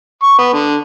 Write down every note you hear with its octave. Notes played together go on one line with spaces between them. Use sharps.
C#6
B3
D3